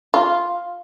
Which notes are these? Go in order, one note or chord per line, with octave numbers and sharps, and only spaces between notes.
F4